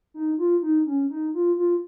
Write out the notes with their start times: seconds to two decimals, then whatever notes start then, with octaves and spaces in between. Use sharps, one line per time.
0.14 D#4
0.38 F4
0.62 D#4
0.86 C#4
1.10 D#4
1.34 F4
1.57 F4